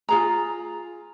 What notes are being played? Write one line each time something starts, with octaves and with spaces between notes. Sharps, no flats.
F4 G#4 A#5